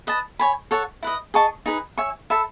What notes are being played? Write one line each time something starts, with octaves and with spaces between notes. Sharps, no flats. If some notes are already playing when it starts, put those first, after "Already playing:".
B4 D#5 A5
C#5 G#5 B5
A4 C#5 F#5 A5
E4 B4 D#5
G#4 D#5 A5 C#6
D#4 G#4 B4
C#5 E5 G#5 C#6
A4 E5 B5